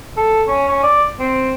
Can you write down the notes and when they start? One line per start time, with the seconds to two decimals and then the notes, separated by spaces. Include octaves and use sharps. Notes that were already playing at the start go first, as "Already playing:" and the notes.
0.17 A4
0.47 C#4
0.69 C#4
0.83 D5
1.19 C4